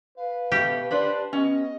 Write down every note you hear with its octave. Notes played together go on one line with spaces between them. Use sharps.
B4 F5
B2 A3 G4
D4 B4 C5 D5
B3 C#4 D#5